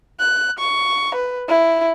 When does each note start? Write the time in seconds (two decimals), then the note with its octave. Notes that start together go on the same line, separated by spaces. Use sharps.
0.20 F#6
0.59 C#6
1.15 B4
1.48 E4